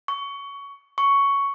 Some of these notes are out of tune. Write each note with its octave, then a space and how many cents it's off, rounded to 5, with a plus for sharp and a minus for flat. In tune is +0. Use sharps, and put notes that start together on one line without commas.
C#6 +20
C#6 +10